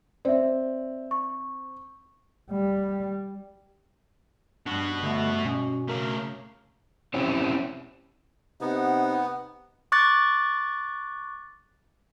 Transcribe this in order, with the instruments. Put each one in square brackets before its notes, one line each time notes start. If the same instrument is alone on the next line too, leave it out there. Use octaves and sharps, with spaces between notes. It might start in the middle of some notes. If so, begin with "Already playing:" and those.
[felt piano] C4 [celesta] D5 E5
[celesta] C#6
[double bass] G3
[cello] G2 [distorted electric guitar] B3 F#4 [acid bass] D4
[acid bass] D3 [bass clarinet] A3
[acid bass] B2 [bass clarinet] C#4
[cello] C#3 [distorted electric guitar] A3 F5 [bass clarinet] A#4
[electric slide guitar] C4 C#4 E4 G4
[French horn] C3 [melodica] B3 [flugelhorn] D#4 [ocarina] F#5
[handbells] C#6 D6 F#6 A6